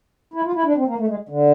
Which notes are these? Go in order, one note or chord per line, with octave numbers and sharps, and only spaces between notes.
E4
F4
E4
D4
C4
A#3
A3
G#3
D3